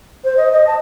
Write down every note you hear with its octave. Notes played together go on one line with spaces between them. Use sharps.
C5
D#5
D#5
A5